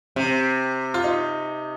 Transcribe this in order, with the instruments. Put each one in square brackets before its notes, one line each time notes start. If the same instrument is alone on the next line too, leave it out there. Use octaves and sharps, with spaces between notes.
[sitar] C3 [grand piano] C4
[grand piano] F4
D#4